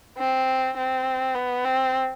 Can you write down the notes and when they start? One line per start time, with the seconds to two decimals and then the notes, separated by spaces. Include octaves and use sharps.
0.18 C4
0.77 C4
1.35 B3
1.64 C4